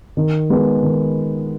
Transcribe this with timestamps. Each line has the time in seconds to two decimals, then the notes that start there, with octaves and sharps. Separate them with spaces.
0.17 D#3
0.50 G#3 B3
0.83 D#3